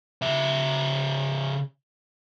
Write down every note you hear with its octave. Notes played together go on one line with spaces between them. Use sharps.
C#3 E5